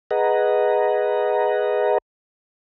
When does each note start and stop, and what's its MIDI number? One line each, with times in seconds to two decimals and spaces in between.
0.11 1.98 68
0.11 1.98 71
0.11 1.98 75
0.11 1.98 78
0.11 1.98 82